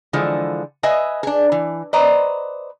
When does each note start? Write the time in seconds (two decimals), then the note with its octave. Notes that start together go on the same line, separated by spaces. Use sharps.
0.13 D3 E3 F3 G#3
0.83 B4 D#5 E5 G#5
1.23 D4 G#4
1.52 E3
1.93 B4 C5 D5 D#5 A#5